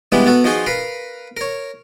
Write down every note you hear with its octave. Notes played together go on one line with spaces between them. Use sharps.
E3 G3 G#3 B3 D4
B3 F#4 A4
F3 D#4 F4 F#4 G#4
A#4 B4 F5
A#4 C#5